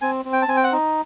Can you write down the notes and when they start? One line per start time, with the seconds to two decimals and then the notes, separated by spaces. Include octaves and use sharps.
0.01 C4 G#5
0.25 C4
0.33 G5
0.42 A5
0.48 C4 G#5
0.57 G5
0.64 F#5
0.72 D#4